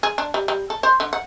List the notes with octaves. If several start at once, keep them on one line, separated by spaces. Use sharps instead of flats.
G#4
D4
G3
G3
A4
C5
D3
F#5